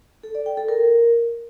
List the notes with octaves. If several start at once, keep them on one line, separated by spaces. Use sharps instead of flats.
A4
D5
G5
A4
A#4